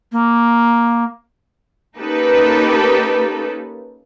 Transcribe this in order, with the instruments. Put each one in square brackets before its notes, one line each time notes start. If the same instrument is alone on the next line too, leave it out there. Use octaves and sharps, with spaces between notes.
[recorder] A#3
[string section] A#3 C#4 D#4 G4 A4 B4